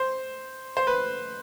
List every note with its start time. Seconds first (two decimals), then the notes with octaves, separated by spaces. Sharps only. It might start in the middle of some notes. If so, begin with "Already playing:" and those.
Already playing: C5
0.77 C5
0.87 B4